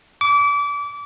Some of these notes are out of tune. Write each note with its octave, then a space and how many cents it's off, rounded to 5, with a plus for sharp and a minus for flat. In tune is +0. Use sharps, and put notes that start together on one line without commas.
D6 -30